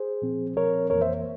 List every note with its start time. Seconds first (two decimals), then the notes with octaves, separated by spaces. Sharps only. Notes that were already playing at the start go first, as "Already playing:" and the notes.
Already playing: G#4 C5
0.22 A#2 F3 C4
0.56 A#2 F3 C4 A#4 C#5
0.90 F2 E3 A#3 A#4 C#5
1.01 C5 E5